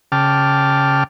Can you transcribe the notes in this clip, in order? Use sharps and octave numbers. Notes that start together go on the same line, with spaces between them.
C#3 G5 A5 D6 F6